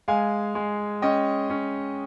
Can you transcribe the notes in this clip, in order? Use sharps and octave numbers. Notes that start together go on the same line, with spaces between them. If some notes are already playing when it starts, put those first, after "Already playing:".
G#3 F5 G#5
G#3
C#4 D#5 G5
C#4